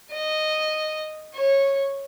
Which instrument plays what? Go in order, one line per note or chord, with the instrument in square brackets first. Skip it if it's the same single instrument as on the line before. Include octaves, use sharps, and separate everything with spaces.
[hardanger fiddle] D#5
C#5